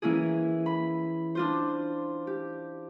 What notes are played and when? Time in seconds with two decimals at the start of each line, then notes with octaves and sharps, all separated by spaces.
0.02 E3 A#3 C#4 E4 G#4
0.66 B5
1.35 D4 F4 C5
2.27 G4